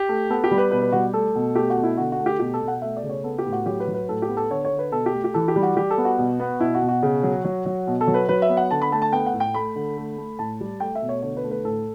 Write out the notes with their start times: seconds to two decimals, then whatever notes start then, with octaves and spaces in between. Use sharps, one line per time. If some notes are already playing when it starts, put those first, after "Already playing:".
Already playing: G4
0.09 A3
0.30 B3 A4
0.44 G4
0.51 G3
0.58 B4
0.71 B2 B4
0.82 B4
0.92 G3 F#4
1.13 A3 A4
1.35 B2
1.55 A3 G4
1.70 F#4
1.77 B2
1.83 E4
1.97 D3 F#4
2.12 F#4
2.19 A3
2.26 G4
2.39 B2 G4
2.54 A4
2.60 B2
2.68 F#5
2.82 A3 E5
2.97 D5
3.03 C#3
3.09 C#5
3.24 B3 A4
3.39 G4
3.45 A2
3.52 F#4
3.66 F#3 G4
3.80 B4
3.87 F#3
3.94 B4
4.09 A2 A4
4.22 G4
4.29 B3
4.37 A4
4.51 D3 C#5
4.65 C#5
4.72 D3
4.79 B4
4.92 B2 A4
5.06 G4
5.13 A3
5.24 G4
5.34 E3 A4
5.48 G4
5.56 G3
5.63 F#4
5.76 G3 G4
5.91 A4
5.98 B3
6.05 F#4
6.18 B2
6.40 B3
6.60 B2 E4
6.75 F#4
6.82 B2
6.88 F#4
7.03 C#3
7.23 F#3
7.45 F#3
7.66 F#3
7.87 B2
8.01 A4
8.08 F#3
8.14 B4
8.29 F#3 B4
8.42 E5
8.49 B3
8.57 F#5
8.71 D3 A5
8.82 B5
8.92 A3 A5
9.02 A5
9.13 B3 G5
9.26 F#5
9.33 A2
9.40 G5
9.54 A3 B5
9.76 D3
9.97 A3
10.18 A3
10.39 A2 A5
10.60 G3
10.80 A3 G5
10.95 E5
11.02 B2
11.09 C#5
11.22 D3 C#5
11.37 B4
11.44 A3
11.51 B4
11.64 A2 A4